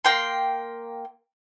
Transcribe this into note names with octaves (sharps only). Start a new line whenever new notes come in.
A#3 G5 C6